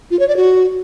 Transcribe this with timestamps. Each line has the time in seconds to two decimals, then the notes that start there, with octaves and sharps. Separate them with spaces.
0.11 F4
0.19 C#5
0.28 D5
0.37 F#4